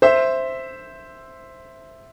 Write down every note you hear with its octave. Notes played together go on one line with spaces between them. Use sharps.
C5 E5